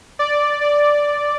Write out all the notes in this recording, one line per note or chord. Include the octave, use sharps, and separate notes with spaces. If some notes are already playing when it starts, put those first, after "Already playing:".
D5
D5